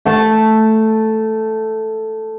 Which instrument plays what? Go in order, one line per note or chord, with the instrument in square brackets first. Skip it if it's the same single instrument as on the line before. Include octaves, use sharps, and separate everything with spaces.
[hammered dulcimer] A3 A5